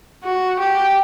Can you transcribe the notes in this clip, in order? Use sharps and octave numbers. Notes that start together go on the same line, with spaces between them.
F#4
G4